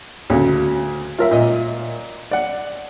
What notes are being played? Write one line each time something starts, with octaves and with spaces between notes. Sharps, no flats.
D2 C#3
F4 A#4 E5
A#2 D#5
D5 F#5